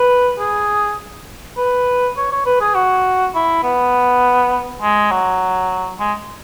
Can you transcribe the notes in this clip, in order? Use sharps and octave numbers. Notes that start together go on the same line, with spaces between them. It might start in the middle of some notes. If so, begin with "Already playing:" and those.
Already playing: B4
G#4
B4
C#5
C#5
B4
G#4
F#4
E4
B3
G#3
F#3
G#3